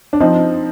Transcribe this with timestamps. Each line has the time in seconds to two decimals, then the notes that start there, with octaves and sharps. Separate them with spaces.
0.13 D4
0.20 F3 C4 D#4